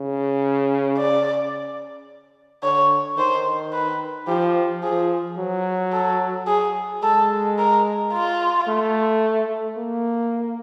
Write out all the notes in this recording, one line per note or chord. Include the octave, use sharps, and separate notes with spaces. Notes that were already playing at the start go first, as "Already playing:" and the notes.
Already playing: C#3
D5
D3 C#5
D#3 C5
B4
F3 G4
F3 G#4
F#3
A4
G#4
G#3 A4
A#4
F4
A3
A#3